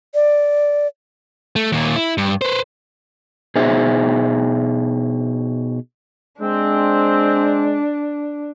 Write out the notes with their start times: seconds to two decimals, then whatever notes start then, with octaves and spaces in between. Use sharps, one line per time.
0.14 D5
1.56 A3
1.72 D#2 A#2
1.96 E4
2.18 G2
2.42 B4 C5
3.55 B2 D#4 G#4 C5 E5
6.42 G#3 C4 D4